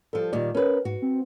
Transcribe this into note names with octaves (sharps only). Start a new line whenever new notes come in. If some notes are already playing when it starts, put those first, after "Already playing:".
F3 G3 A4
A#2 D#3 G3 D5
C#4 A#4 B4
G#2 F#4
C4